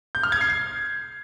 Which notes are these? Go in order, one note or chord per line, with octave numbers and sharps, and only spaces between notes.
G6
F6
G#6
C7